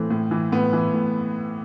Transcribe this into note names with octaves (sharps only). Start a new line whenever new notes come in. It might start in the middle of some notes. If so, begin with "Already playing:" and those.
Already playing: A2 E3 A3 C4
A2
E3
A2 B3
E3
A2